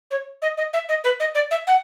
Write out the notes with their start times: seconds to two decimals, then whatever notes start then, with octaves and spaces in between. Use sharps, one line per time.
0.10 C#5
0.41 D#5
0.57 D#5
0.73 E5
0.88 D#5
1.03 B4
1.19 D#5
1.34 D5
1.50 E5
1.66 F#5